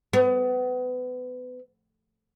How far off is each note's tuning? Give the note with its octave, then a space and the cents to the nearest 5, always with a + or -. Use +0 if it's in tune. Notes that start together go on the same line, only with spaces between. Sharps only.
B3 +30